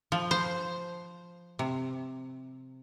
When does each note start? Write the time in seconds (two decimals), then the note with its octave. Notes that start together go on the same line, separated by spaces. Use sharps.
0.12 F3
0.31 C5
1.59 C3